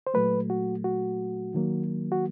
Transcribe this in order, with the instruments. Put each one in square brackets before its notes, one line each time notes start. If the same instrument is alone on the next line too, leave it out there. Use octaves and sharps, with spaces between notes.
[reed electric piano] C5
A#2 F#3 A3 B4
F#4
F#4
D#3 F#3 A#3
F#4